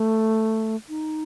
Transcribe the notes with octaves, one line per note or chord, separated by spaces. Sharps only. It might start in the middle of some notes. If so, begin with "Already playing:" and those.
Already playing: A3
D#4